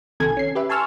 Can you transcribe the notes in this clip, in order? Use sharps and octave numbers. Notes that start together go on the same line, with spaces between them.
B1 C3 D#3 A4 G#5 G#6
C#4 C7
G4 B4 E5
G#5 A5 C6 C#6 E6 F6